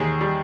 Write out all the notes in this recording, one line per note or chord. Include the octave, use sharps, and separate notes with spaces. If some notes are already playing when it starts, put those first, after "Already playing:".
Already playing: D#2 G#3 G#4
G3